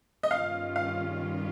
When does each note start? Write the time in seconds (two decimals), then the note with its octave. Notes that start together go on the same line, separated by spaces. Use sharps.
0.23 D#5
0.30 G2 D#3 G3 C#4 F4 F5
0.76 F5